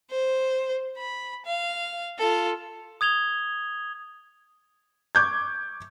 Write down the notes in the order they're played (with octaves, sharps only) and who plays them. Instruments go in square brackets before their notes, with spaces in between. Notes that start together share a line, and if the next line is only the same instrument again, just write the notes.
[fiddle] C5
B5
F5
F4 A4
[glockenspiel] D#6 G#6 F7 G7
[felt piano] C#6 D6 G6 G#6